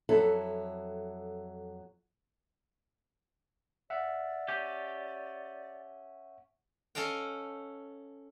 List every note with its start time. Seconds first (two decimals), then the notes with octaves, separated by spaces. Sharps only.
0.09 F2 F#3 E4 A4
3.90 D5 E5 F#5
4.48 C#4 G4
6.95 C#4 A4 D#5 F5 G5